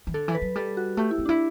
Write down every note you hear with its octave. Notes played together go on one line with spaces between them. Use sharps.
E3
D3 A4
E3
B4
F#3
G3 A4
F#4
A3 G4
E4
C4
D4 E4